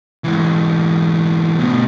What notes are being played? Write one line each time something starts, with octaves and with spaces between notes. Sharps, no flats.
G#2 E3
D2 B2